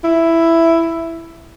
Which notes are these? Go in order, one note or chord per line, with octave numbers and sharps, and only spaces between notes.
E4